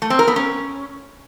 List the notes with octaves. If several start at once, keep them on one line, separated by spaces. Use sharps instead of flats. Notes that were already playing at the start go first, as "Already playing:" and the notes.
A3
C4
A#4
B3
C#4